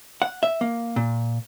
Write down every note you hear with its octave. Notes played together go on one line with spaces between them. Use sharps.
F#5
E5
A#3
A#2